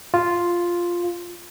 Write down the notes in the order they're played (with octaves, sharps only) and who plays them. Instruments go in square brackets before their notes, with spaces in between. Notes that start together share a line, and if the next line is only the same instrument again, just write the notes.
[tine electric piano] F4